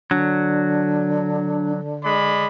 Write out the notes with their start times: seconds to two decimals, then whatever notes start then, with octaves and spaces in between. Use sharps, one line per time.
0.11 D3 F#3 D4
2.04 G#3 D5 B5